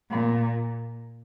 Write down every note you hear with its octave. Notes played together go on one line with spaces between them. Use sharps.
A#2